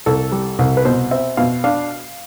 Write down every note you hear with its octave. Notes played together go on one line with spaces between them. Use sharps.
C2 A4
G3
C2
B4
B2 C5
C4 E5
B2 F5
D4 F5